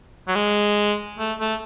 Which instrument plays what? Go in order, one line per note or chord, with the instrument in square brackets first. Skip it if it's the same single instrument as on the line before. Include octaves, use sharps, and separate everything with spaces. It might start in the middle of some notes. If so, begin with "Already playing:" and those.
[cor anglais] F#3
G#3
A3
A3